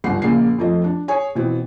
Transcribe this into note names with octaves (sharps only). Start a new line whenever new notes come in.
G1 C#2 G#2 F#5 C7
A#1 C#3 A#3 C7
F2 F3 A3 D#5
D4
G#4 C#5 G#5
B2 E3 C4